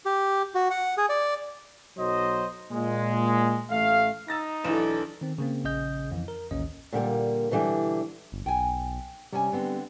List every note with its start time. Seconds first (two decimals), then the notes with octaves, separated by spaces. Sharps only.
0.06 G4
0.55 F#4
0.71 F#5
0.97 G#4
1.09 D5
1.98 B1 F#3 C5 D#5
2.71 A#2 G#3
3.71 A1 A3 F5
4.28 D#4 E6 A6 A#6
4.64 B1 E3 D4 E4 A4 E7
5.21 D#3 C4
5.38 C#3 A#3 C4
5.64 A#1 C#3 G#4 D#5 G6
6.11 F2 E3
6.28 A#4
6.51 A1 D#2 C#4 D#5
6.92 A#2 D3 G3 A#3
7.51 B2 D3 E3 G3 D4
8.32 G1
8.46 B1 G5 G#5
9.32 C3 G3 C#4 G#5
9.52 D3 B3 C4